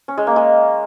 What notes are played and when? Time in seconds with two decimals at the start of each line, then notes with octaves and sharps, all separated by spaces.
0.08 C#4
0.18 G#3
0.27 A#3
0.36 G#3